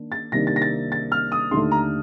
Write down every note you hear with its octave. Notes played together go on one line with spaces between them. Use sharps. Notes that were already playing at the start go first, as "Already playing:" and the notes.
Already playing: D#3 A#3 D4
A6
C2 C3 D#3 A#3 D4 A#6
A6
A#6
A6
A6
F6
D#6
D#2 D3 A3 C6
A#5